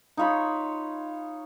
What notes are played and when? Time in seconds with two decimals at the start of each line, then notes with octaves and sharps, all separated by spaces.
0.17 D#4 F4 C#5 B5